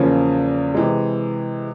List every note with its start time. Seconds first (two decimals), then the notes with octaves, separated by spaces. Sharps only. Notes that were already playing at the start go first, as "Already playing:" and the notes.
Already playing: E2 C#3 F3 A#3 C#4
0.74 C3 E3 G#3